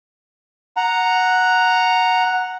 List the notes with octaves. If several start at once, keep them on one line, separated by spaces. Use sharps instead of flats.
F#5 A#5